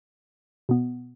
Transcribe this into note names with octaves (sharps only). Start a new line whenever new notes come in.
B2 B3